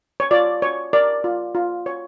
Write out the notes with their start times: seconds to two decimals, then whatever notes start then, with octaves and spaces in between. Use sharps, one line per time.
0.20 C#5
0.31 F4 D5
0.62 C#5
0.93 A#4 D5
1.24 F4
1.55 F4
1.86 C#5